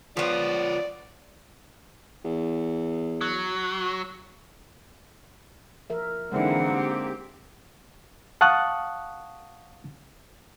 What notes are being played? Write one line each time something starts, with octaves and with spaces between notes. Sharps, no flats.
F3 B3 F4 C#5 D5
E2
F#3
F3 A#4 E5
D3 E3 G#3 A#3 C4 D#4 F#5
G4
F5 F#5 A5 C#6 D#6 F#6